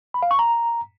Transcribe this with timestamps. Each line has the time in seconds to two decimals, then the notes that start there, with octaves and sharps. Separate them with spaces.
0.14 B5
0.23 F5
0.31 C#6
0.39 A#5